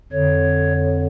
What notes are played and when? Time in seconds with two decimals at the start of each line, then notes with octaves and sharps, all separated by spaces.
0.12 F2 D3 C#5